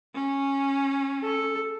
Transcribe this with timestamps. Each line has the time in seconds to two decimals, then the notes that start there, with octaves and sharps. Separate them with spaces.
0.15 C#4
1.24 A4